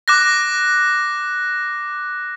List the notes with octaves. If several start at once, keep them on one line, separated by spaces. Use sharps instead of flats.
D6 F#6 A#6